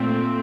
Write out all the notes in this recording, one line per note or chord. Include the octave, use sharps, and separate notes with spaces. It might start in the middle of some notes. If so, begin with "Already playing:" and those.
Already playing: A#2 A3 C4